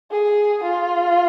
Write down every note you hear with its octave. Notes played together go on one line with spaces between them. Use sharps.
G#4
F4